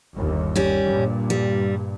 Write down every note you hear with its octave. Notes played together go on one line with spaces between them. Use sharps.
G1 D#2
G3 C#4
G2 A#2
G3